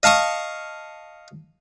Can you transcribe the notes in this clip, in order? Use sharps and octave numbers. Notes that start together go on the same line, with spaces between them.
D#5 F5 A5 C#6 D#6